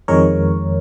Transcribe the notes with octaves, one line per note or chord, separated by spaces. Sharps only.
F2 D#3 G#3 A#4 C#5